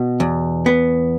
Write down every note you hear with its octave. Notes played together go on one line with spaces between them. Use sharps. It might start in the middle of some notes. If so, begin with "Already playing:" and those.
Already playing: B2
E2
B3